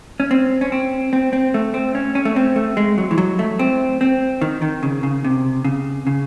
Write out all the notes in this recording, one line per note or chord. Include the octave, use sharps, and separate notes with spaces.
C#4
C4
C#4
C4
C4
C4
A3
C4
C#4
C#4
A3
C4
A3
G#3
F#3
E3
F#3
A3
C4
C4
D#3
D#3
C#3
C#3
C3
C#3
C#3